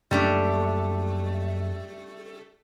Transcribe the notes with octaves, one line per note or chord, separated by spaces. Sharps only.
F#2 G3 A3 A#3 D4